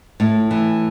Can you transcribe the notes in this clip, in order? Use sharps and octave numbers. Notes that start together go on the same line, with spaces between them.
A2
E3